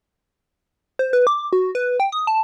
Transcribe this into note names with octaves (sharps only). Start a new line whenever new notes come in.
C5
B4
D6
F#4
B4
G5
D#6
A5